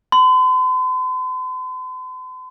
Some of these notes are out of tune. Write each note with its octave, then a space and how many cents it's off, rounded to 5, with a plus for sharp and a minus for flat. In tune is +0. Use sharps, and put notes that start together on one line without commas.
C6 -45